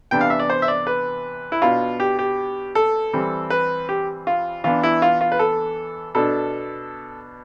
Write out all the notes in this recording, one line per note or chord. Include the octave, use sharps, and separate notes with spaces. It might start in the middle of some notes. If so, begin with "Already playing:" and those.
C3 E3 B3 D4 G5
F5
E5
D5
C5
E5
D5
B4
E4
B2 B3 D4 F4
G4
G4
A4
E3 G3 C4
B4
G4
F4
E3 B3 D4 F4
E4
F4
F4
B4
A4
B2 B3 D4 A4